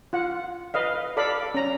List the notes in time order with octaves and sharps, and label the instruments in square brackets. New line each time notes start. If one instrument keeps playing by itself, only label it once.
[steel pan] F4 F#5
B4 D#5 F5
A4 D5 F5 B5
C#4 A#5